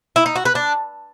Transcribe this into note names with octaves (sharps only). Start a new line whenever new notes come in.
E4
D#4
F#4
B4
D4